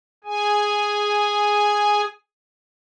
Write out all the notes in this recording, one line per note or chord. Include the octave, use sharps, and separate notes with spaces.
G#4 G#5